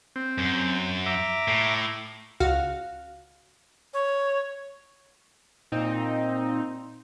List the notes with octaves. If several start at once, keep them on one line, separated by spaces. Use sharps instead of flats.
C4
F#2
E5 A#5 D6
A2
C#2 F#4 F5
C#5
A#2 C4 D#4